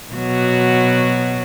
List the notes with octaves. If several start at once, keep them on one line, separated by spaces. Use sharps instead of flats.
B2 F#3 F#4